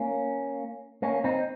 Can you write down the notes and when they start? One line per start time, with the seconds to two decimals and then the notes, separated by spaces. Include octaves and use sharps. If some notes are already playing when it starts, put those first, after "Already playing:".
Already playing: A#3 C#4
1.02 A#3 C#4
1.24 C4 D#4